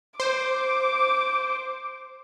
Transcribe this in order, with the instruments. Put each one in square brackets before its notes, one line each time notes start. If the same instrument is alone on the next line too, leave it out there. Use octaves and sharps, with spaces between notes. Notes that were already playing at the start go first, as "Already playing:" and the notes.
[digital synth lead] C5 [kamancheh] D6